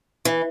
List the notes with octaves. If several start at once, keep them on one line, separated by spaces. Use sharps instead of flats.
E3